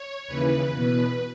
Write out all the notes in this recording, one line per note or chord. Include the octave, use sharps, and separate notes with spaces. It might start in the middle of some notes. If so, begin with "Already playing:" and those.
Already playing: C#5
D#2 C#3 E3 B4
E2 B2 B4